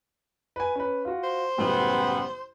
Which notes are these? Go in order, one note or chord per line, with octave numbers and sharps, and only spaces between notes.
B4 G#5
C#4 B4
F4 F#4
C5
A1 F#2 C#3 G3 B3